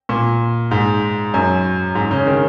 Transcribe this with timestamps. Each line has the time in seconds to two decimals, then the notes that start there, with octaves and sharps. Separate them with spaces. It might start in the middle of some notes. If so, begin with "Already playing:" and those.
0.09 A#2
0.71 G#2
1.34 F#2
1.95 G#2
2.11 C#3
2.27 D#3